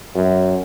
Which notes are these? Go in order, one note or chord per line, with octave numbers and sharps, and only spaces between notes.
F#2